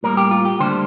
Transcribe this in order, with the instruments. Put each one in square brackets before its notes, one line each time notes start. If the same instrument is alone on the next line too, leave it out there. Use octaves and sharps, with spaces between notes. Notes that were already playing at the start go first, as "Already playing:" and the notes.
[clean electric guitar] A2 G3 A#3 A#4
G4
F4
G4
D2 D3 G3 A#3 C5